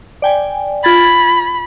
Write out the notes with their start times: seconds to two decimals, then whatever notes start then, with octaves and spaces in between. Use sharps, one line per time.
0.22 D5 G5 G#5
0.84 F4 B5 G#6 A6